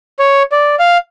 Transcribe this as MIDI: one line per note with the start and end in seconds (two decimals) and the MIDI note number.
0.19 0.43 73
0.52 0.75 74
0.79 0.98 77